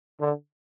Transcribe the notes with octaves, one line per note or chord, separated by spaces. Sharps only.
D3